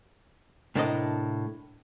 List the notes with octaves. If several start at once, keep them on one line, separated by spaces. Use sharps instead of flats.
A2 C3 D4 A#4 B4 D#5